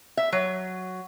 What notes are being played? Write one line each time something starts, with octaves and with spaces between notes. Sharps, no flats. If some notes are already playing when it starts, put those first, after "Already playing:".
E5
F#3